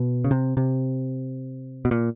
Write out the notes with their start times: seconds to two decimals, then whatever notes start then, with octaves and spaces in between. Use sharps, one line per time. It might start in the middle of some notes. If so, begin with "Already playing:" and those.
Already playing: B2
0.24 C#3
0.31 C3
0.57 C3
1.85 B2
1.91 A#2